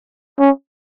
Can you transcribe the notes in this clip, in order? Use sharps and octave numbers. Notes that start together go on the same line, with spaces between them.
C#4